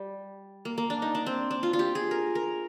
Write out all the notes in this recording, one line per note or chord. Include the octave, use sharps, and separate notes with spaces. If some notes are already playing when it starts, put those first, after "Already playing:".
Already playing: G3
A#3
A#3
D4
D#4
D4
C4
D4
F4
F4
G4
G#4
A#4
A#4